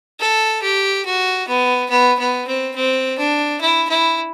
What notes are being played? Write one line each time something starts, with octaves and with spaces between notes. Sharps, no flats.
A4
G4
F#4
B3
B3
B3
C4
C4
D4
E4
E4